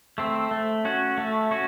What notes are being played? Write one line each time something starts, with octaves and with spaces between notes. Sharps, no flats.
A3 C4
A3
C#4 F#4
A3
C#4 F#4